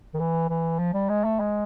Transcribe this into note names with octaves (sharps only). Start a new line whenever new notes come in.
D#3
E3
E3
F3
G3
G#3
A3
G#3